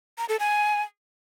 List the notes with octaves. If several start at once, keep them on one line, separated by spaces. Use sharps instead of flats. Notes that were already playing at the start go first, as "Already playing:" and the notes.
A#5
A4
G#5